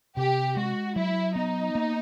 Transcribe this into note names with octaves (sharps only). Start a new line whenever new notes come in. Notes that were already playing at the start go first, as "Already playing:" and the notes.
C3 G4
G#3 F#4
F#3 E4
B3 D#4
A#3